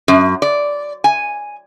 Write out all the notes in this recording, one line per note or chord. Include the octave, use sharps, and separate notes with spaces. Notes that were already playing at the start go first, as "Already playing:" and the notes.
F#2
D5
G#5